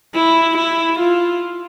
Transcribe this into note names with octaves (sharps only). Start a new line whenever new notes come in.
E4
E4
F4